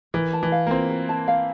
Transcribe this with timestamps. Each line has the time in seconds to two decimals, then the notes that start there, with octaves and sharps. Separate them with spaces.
0.14 E3 A#4
0.33 A5
0.43 E3
0.52 F5
0.67 A#3
0.71 C4 F4
0.90 A#4
1.09 A5
1.28 F5